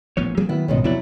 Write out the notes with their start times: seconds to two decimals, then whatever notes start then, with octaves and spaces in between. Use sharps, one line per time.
0.17 A1 A#2 F3 B3 C#5
0.37 F3 F#3 A#3 C4 G#4
0.49 D#3 B3 E4
0.68 B1 G#2 B2 C#4
0.84 F2 C3 F#3 B3 C4 E4 D5